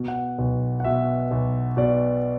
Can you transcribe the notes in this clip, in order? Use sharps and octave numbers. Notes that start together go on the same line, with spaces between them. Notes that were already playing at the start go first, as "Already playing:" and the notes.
Already playing: B2
F#5
B1
F#5
B2 E5
B1
B2 D5